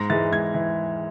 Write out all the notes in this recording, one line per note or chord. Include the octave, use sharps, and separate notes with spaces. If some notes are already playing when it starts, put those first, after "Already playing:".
Already playing: G#2 A#6
E3 G#3 A6
G#2 G#6
E3